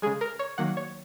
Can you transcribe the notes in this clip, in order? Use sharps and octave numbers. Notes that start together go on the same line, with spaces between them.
C#3 G#3 G#4
A#4
C#5
D#3 F#3 A#3 F#5
C#5